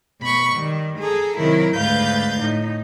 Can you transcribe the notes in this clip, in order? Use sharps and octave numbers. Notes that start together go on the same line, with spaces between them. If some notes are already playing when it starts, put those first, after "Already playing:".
B2 B5 C#6
D#3 G3
G#4 A4 A#5
C3 D#3 F#3 E4 A#4
D2 G#2 B4 F5 G6 A6
A2 D#4